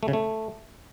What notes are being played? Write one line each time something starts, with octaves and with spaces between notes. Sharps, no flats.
A3
C#3
A3